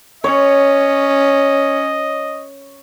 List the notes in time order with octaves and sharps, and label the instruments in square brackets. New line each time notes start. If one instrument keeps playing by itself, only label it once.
[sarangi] C#4 [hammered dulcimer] C#5 [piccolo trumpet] D#5